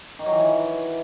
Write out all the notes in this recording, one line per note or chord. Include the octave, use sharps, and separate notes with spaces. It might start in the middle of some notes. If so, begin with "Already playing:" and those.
D#3
F#3
E3